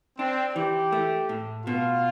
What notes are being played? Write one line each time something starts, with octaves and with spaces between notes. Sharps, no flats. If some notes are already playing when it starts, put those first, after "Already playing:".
C4 D4
E3 G4
A3
A2
B2 F4